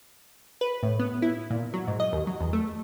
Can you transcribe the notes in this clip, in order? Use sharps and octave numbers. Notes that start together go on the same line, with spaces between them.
B4
A2
B3
E4
A#2
F#3
G#2
D#5
D#2
F#3
E2
A3